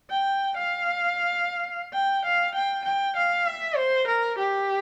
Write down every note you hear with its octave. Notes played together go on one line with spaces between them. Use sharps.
G5
F5
G5
F5
G5
G5
F5
E5
C5
A#4
G4